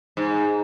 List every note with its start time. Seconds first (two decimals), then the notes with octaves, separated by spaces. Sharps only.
0.17 G#2